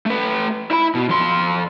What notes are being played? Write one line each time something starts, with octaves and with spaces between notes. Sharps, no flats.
A3 B4
E4 B5
B2
F2 C6